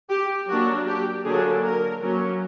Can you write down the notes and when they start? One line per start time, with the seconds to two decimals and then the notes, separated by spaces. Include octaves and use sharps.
0.09 G4
0.48 F#3 A#3 D4 F#4
0.87 G4
1.25 D3 F#3 A#3 D4 G#4
1.63 A#4
2.01 F#3 A#3 C#4